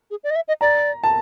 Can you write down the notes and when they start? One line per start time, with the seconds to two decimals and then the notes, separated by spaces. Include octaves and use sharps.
0.11 G#4
0.24 D5
0.30 D#5
0.36 E5
0.48 D#5
0.61 D5 A#5
1.04 A5